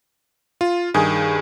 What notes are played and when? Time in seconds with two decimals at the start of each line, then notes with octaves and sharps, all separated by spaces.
0.61 F4
0.94 G2 D#3 G#4